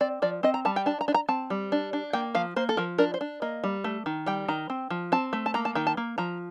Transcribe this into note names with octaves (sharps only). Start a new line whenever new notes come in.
C4 D5
F3 D5
C4 D#5
A#5
G3 A5
G5
D4 A5
A#5
D4
A#5
C4 A5
G3
D4
D4
A#3 G5
F3 F5
A#3 C5
A4
F3 A#4
D4 A#4
C5
D4
A#3 D#5
G3
A3
D#3
G3 G5
D#3 A#5
C4
F3
C4 A5
A3
A5
A#3 A#5
A5
D#3 G5
A5
A#3
F3 A#5